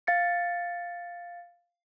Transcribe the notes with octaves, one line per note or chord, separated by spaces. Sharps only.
F5 A6 C#7